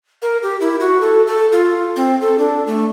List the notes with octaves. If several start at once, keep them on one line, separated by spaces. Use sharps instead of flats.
A#4
G4
E4
F#4
A4
A4
F4
C4
A4
D4
A3